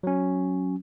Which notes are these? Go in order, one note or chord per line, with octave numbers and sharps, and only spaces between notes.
F#3 C#4